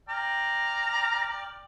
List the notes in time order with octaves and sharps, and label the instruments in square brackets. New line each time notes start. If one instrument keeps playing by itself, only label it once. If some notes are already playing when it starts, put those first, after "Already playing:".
[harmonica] D5 G5 F6 [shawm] A#5